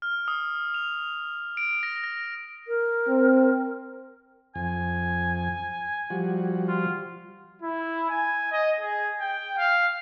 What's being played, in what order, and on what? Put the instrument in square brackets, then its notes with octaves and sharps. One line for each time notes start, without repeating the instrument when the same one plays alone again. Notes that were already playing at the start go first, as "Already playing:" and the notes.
[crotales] F6
D#6
F7
D7
A#6
A#6
[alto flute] A#4
[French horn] C4
[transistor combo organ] F2 [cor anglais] G#5
[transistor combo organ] F3 G3 F#4
[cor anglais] F4
[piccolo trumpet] E4
G#5
D#5
G#4
G5
F5